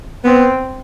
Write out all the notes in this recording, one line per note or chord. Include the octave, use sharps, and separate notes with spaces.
B3 C4